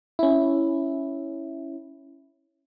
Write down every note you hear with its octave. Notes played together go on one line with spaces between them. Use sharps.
C#4 E4